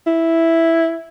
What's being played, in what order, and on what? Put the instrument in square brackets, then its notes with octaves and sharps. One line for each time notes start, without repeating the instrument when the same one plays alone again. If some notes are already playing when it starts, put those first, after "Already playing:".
[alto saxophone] E4